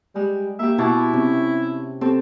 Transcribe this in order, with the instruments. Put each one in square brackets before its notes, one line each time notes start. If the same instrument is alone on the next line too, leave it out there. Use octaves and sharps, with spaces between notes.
[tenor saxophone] G3 [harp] G#3
[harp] A#3 G4 [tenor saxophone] E5
[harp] B2 A5 D6 [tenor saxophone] E4
[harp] C3 C4 C#4
C4 G4 A4